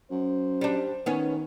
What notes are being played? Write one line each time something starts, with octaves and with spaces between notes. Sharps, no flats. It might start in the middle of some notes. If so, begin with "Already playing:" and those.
F#2 C5
G3 D4
D#3 B3 C#4